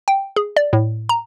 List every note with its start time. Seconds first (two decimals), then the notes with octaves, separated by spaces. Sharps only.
0.08 G5
0.36 G#4
0.57 D5
0.73 A2
1.09 A#5